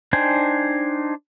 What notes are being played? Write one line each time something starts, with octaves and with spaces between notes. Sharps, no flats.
D4 D#4 C5 G5 G#5